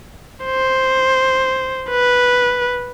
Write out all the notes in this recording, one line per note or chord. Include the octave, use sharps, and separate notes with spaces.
C5
B4